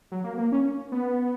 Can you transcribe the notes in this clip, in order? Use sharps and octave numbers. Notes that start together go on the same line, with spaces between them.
F#3
A#3
A#3
C#4
B3